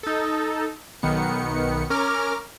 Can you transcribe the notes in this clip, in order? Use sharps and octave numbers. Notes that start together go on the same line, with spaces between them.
D#4 A4
B1 D#3 B3 C#7
C#4 A#4 D6 F6